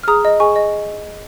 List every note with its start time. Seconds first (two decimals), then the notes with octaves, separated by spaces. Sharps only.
0.04 F6
0.08 G#4 A#5 D#6
0.25 D#5
0.40 G#4 G#5 C#6
0.56 D#5